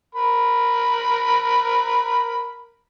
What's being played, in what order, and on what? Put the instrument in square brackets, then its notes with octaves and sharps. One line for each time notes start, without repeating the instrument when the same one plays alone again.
[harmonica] A#4 B5